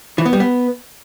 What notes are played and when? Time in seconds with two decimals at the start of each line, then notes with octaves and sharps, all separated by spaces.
0.18 E3
0.25 B3
0.33 G3
0.40 B3